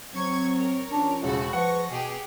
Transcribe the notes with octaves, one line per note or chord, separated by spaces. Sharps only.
F#3 C4 C#6 G#6
A#4 C#5
F3 C#4 D4
E1 C#3 E4 F#4 A4
F3 G#4 B4 F#5 C#6 A#6
B2 B3 G4 G#4